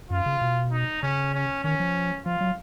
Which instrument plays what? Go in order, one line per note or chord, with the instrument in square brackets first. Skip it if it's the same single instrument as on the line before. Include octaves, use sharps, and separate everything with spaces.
[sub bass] F#2 [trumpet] F4
[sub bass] C#3
B2
[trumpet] D#4
[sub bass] C#3 [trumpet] C#4
[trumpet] C#4
[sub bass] D#3 [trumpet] C#4
[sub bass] F3
[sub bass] F3 [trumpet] F4
[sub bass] F#3